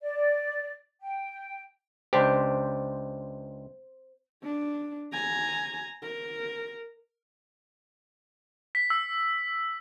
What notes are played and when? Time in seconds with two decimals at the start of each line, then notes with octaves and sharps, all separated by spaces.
0.01 D5
1.01 G5
2.13 C#2 D4 G4 C5
4.43 D4
5.13 G#5 A#5
6.02 A#4
8.75 B6
8.90 E6